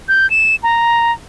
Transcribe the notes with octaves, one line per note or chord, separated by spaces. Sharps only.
G6
E7
A#5